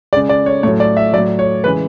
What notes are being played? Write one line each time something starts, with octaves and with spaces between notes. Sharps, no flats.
C#3 G#3 D5
D5
C#5
A2 F#3 C#5
D5
E5
F#3 D5
A2
C#5
C#3 E3 G#3 B4